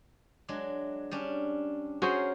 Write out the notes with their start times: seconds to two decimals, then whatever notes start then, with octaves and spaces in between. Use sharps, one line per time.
0.49 F#3 G#3 D4
1.11 G3 C#4 D4
2.02 C#4 F#4 G#4 A#4 C5 C#5